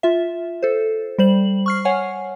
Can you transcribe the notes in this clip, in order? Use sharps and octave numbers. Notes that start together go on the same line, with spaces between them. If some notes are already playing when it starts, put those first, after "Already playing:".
F4 E5
A4 C5
G3 C5 F#7
C#6 F6 C7
C#5 F#5 G#5